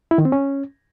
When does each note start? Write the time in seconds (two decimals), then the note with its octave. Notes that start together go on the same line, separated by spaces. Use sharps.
0.11 E4
0.18 D#3
0.25 C4
0.32 C#4